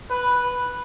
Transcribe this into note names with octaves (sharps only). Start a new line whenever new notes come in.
B4